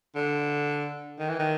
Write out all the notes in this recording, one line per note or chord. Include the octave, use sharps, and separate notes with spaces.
D3
D#3
E3
D#3